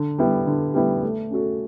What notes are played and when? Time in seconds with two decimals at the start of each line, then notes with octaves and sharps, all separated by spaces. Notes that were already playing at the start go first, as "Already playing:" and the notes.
Already playing: D3
0.18 G3 B3 E4
0.47 D3
0.74 G3 B3 E4
1.03 A3
1.30 C#4 F#4 A4